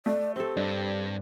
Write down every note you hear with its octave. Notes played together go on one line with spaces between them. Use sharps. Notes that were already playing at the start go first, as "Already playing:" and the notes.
A3 D5
C4 G4 A4
G2 D4